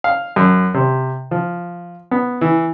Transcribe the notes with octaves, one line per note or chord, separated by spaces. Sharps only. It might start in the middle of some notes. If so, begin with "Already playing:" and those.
F5
F#2
C3
F3
B3
E3